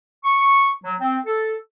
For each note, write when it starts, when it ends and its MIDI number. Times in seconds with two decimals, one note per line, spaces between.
0.24 0.70 85
0.83 0.95 54
1.01 1.18 60
1.26 1.54 69